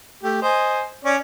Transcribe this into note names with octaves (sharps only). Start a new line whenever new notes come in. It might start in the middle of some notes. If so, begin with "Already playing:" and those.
A3 G4
C5 D#5 G#5
C#4 C#5 D5